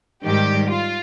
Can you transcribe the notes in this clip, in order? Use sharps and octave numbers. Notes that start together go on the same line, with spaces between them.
G#2 D#3 G3 G4
F4